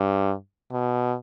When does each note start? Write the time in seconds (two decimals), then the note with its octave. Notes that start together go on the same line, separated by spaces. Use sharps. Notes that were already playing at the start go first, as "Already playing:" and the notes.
Already playing: G2
0.72 B2